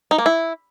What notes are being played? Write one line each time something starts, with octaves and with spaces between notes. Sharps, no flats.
D#4
A#3
E4